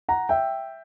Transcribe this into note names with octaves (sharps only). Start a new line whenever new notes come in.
F#5 A#5
E5 G5